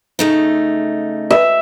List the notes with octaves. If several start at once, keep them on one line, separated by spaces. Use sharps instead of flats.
C#3 A3 D#4
E5